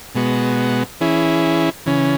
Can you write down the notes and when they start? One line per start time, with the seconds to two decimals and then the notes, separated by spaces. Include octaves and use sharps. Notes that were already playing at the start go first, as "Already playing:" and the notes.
0.15 B2 G#3 B3 F#4
1.01 E3 C#4 E4 G#4
1.86 C#3 E3 C#4